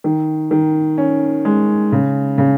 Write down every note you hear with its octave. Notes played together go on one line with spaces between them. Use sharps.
D#3
D#3
C#4
G#3
C#3
C#3